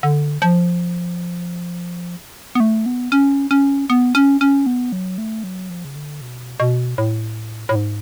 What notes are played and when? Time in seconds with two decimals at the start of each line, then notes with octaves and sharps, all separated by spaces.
0.03 D3
0.42 F3
2.55 B3
2.60 A3
2.86 B3
3.12 C#4
3.51 C#4
3.90 B3
4.15 C#4
4.41 C#4
4.66 B3
4.92 F#3
5.18 A3
5.44 F#3
5.69 F3
5.85 C#3
5.96 D3
6.21 B2
6.60 B2
6.98 A2
7.69 A2
7.75 G#2